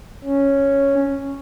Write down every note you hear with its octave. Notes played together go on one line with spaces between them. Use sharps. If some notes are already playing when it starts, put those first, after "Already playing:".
C#4